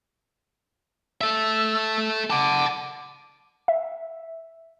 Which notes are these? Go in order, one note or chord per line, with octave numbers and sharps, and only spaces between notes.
A4 E5 E6
F#5 A5 D6
E5